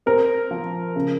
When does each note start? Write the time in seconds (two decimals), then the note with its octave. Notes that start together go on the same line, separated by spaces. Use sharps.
0.06 C4 A#4
0.51 F3
0.96 C#3